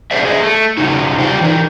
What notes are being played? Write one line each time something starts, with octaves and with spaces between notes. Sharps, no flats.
D3 G#4 C5 D5 E5
G#4 D#5 E5
A3
C#3 F#3 D#4
F4 G4 C5 D5 F5 G5
E3 D#4